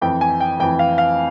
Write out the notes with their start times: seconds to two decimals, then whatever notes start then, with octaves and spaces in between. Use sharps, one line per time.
0.01 F2 E3 G5
0.21 G#5
0.40 G5
0.60 F2 E3 G5
0.79 F5
0.98 F5